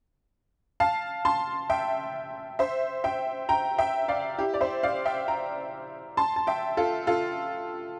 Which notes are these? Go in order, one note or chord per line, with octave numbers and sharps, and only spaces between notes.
F5 A5
A5 C6
E5 G5
C5 E5
E5 G5
G5 A#5
E5 G5
D5 F5
E4 G4
D5
C5 E5
D5 F5
E5 G5
G5 A#5
A5 C6
A5
E5 G5
F4 A4
F4 A4